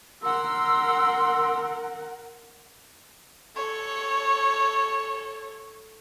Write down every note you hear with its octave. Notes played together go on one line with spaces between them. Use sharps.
A#4 F#5 C6 E6
A4 C#5